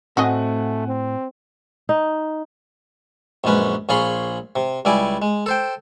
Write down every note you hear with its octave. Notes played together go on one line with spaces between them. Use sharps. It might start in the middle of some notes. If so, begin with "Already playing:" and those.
A2 A3 C4 F#4 D#5 F#5 G#5
C4
D#4
A#1 F#2 G#3 C#4 B4
A#1 F4 G#4 C#5 B5 C6
C3
C#2 G3 E4 D5 G#5
G#3
A4 C5 G5